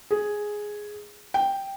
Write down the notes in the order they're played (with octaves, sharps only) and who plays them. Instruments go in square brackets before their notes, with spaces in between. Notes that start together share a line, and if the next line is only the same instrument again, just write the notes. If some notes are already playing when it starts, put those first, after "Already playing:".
[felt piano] G#4
G5